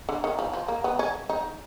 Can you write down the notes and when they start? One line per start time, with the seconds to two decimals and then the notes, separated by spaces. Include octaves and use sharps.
0.09 D3
0.24 D#3
0.39 F3
0.53 F3
0.68 A#3
0.84 B3
0.99 C#4
1.29 D#4